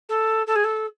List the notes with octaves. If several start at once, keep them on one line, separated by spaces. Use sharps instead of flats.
A4
A4
G#4
A4